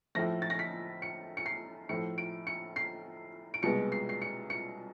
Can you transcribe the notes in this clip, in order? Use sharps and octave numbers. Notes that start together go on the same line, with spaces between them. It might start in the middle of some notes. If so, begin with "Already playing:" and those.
A2 F3 A3 A#6
A6
A#6
B6
C#7
C#7
C7
A2 F3 A3 C#7
D7
C#7
C7
D7
C2 B2 G#3 B3 C#7
C7
C7
C#7
C#7